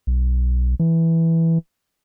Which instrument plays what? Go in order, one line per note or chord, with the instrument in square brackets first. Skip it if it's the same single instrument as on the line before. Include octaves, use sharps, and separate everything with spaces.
[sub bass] B1
E3